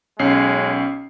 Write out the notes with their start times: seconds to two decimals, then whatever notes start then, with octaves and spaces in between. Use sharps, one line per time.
0.19 B1 G#3 C#4 C7